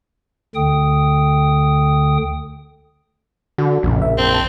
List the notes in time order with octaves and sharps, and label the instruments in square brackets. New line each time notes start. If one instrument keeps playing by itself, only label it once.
[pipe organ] D2 D3 G5 D#6
[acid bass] D3 [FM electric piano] F#4
[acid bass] A#1 [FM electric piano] F2 A2 C#3
[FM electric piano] E5
[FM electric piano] F#2 A5 G6 [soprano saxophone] C4
[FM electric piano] G5 A5